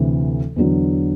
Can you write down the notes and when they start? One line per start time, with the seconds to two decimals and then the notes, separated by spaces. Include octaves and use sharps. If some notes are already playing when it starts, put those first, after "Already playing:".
Already playing: D2 C3 E3 A3
0.56 E2 D3 F#3